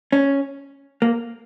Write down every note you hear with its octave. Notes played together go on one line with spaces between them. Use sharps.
C#4
A#3